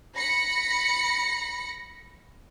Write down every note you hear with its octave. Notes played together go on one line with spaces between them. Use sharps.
B5 A#6 C#7